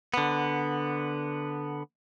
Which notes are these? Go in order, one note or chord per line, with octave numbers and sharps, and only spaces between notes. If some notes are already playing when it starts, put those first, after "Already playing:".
D3 B3